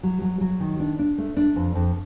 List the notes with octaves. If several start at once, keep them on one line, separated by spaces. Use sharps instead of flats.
F#3
F#3
F#3
D#3
D4
D4
A3
D4
F2
F2